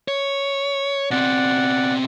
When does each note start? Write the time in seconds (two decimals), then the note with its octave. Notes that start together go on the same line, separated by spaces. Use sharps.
0.08 C#5
1.11 B2 C4 D5 F#5